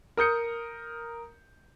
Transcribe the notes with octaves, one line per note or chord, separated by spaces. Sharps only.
A#4 D#6 G6 C#7